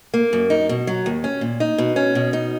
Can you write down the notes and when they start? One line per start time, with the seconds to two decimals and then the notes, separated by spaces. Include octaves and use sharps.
0.14 A#3
0.33 F#2
0.50 D#4
0.69 B2
0.87 F#3
1.06 D#2
1.24 C#4
1.41 A#2
1.60 D#4
1.78 B2
1.96 C#4
2.15 B2
2.33 D#4